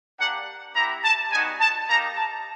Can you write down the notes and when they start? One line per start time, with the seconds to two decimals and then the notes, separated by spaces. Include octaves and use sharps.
0.19 A#3 D4 G4 F#5
0.75 B3 E4 G4 A#5
1.04 A5
1.31 G3 B3 D#4 F#4 G#5
1.60 A5
1.88 A#3 D#4 G4 A#5
2.15 A5